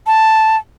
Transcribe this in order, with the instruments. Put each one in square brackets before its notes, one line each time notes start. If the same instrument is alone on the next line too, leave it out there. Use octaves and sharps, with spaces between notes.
[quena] A5